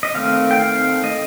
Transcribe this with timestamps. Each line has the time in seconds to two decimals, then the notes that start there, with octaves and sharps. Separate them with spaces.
0.03 D#5
0.15 D#3 A3 C4 F5
0.51 G5
0.59 F5
1.04 D#5